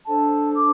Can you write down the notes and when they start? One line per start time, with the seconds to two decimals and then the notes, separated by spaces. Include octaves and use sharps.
0.07 D4 A4 C5 A5
0.55 D6